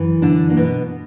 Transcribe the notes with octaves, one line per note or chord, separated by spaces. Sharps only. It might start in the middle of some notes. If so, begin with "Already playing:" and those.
Already playing: F#2 E3
D3 D4
A#3
B2 B3